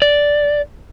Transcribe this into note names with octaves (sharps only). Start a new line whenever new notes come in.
D5